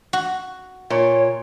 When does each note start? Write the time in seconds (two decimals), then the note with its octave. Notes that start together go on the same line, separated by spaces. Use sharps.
0.13 F#4
0.90 A#2 C#5